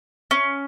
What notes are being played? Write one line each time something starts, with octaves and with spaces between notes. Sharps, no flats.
C#4